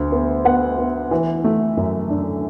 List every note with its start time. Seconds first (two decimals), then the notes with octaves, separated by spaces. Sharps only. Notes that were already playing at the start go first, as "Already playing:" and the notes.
Already playing: D2
0.12 B3
0.45 B3 F#5
0.78 B3
1.11 E3
1.44 A3
1.77 F#2 E5
2.10 D4